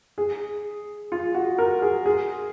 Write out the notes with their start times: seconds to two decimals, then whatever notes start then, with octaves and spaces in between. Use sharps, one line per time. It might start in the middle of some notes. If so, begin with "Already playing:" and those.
0.18 G#4
1.12 F4
1.35 F#4
1.59 A#4
1.82 G#4
2.06 G#4